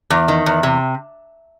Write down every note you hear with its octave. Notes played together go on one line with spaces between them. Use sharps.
E2
D#3
E2
C3